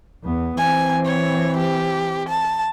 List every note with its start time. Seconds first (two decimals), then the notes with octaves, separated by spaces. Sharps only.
0.23 E2 B3
0.58 E3 C4 G#5
1.06 C#5
1.57 G4
2.29 A5